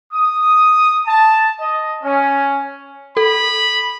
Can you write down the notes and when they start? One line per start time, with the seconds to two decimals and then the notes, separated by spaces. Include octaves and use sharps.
0.13 D#6
1.08 A5
1.60 D#5
2.04 C#4
3.17 A4 B5